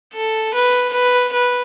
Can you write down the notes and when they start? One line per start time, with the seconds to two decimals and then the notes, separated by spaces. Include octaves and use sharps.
0.15 A4
0.54 B4
0.93 B4
1.33 B4